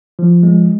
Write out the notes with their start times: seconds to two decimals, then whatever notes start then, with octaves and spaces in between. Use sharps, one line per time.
0.19 F3
0.43 G#3